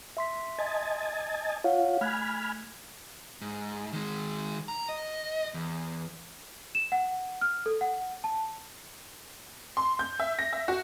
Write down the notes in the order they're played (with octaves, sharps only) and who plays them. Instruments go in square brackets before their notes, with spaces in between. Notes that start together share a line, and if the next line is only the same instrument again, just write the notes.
[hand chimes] E5 C6 B6
[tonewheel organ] D#5 G#5 A5
[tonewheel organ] F4 [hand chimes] C#5 F5 F#5
[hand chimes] A3 F#6 G#6 [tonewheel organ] G#5 B5 F6
[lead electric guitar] G#2
D#3 G#3
A#5
D#5
E2
[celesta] E7
F#5
F6
A4
F#5
A5
[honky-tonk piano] C6
G6
E5
A#6
E5
F#4